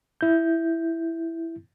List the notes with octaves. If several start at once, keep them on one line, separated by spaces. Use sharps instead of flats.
E4 G6